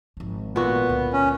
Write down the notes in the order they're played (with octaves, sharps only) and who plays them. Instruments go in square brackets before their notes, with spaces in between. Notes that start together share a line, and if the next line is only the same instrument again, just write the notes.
[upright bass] G#1 F3
[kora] A#2 F#4 [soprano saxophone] B3
[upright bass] C#2 D3
[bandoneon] C#4